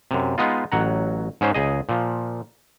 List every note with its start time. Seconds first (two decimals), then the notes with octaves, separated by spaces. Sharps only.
0.11 F#2 C3
0.38 G#3 B3 D#4 F4
0.72 A1 F#3 F#5 A#5
1.41 G#2 C#4 C5
1.54 C#2 G#4 D#5
1.89 A#2 F3